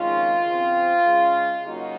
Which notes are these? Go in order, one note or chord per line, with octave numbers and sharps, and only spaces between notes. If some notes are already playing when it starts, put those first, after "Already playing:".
Already playing: F2 D#3 G#3 C#4 F4
C#3 F3 C4
C#3 G#3 C#4
C#3 F#3 A#3 C#4 D#4 F#4